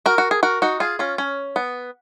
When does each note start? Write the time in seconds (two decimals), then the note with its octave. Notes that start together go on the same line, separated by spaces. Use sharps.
0.06 F#4 A#4
0.18 F#4
0.31 G#4
0.43 F#4 A#4
0.62 D#4 F#4
0.80 F4 G#4
0.99 C#4 F4
1.18 C#4
1.56 B3